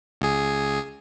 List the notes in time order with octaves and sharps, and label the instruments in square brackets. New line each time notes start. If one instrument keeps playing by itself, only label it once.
[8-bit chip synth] C#2 G#4